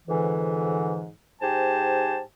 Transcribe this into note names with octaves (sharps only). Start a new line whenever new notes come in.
F2 G#2 D3 E3
G#2 G4 C5 G#5 A5